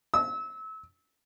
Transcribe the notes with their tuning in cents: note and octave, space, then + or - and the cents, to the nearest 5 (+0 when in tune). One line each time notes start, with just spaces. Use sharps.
E6 -30